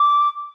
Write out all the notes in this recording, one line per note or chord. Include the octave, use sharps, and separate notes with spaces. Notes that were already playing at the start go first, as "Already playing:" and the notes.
Already playing: D6